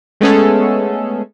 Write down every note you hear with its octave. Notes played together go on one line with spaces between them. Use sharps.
G#3 A3 B3 C#4 G#4 A4